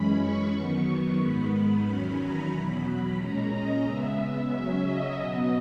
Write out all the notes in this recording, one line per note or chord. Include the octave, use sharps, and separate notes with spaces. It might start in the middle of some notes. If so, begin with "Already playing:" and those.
Already playing: F#2 E3 G#3 C#4 B5
C#6
F#2 D#3 F#3 B3 C#6
G#2 D#3 G#3 B3 B5
E2 D#3 F#3 C#4 B5
A#5
E2 B2 F#3 B5
A#2 G#3 C#4 A#5
D#5
C#3 G#3 B3 E5
C#3 F#3 C#4 E5
D#5
B2 F#3 B3